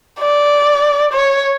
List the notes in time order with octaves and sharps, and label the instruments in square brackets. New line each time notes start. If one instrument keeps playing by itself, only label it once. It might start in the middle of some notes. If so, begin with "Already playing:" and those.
[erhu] D5
C#5